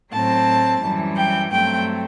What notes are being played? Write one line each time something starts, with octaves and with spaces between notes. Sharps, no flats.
A2 F#3 C4 A5
F#2 E3 G3
G5
G2 F#3 A3 C4 G5